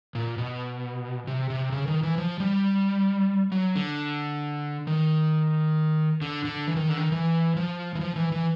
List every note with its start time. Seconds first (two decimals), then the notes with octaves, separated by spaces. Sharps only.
0.15 A#2
0.38 B2
1.27 C3
1.50 C3
1.72 C#3
1.88 D#3
2.03 E3
2.18 F3
2.40 G3
3.52 F#3
3.75 D3
4.87 D#3
6.22 D3
6.45 D3
6.67 E3
6.76 D#3
6.88 D3
6.97 D#3
7.12 E3
7.57 F3
7.95 E3
8.01 F3
8.16 E3
8.32 E3